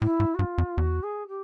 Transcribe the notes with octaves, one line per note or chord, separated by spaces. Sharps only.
A2 E4
G#2
F#4
G2 F4
F2
E2 F#4
G#4
G4